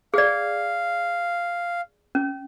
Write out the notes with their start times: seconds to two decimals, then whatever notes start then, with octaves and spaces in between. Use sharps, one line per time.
0.14 G#4 D5 F5
2.15 C#4